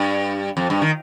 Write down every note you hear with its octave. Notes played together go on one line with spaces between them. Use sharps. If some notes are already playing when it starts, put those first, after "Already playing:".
Already playing: G2
F2
G2
D#3